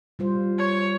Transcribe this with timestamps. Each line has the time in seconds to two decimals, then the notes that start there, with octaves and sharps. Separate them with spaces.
0.19 G3 F4 C5
0.58 C#5